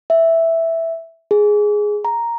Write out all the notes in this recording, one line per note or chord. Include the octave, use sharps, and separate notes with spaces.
E5
G#4
A#5